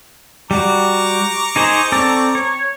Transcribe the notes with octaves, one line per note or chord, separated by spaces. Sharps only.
G3 F#4 A#5 C#6 D6
D#4 G#4 C5
C4 A4 D5
C#5